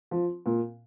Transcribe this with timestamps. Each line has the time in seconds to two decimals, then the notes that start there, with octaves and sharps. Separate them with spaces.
0.11 F3
0.46 A#2